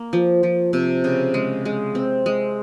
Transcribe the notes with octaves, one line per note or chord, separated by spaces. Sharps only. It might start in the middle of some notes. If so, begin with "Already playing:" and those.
Already playing: A#3
F3
F3
C3
C#3
G#3
G#3
C4
G#3